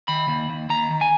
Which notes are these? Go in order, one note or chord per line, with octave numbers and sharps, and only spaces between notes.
D#3 B5
D#2
D#2
D#2 A#5
D#3
G#5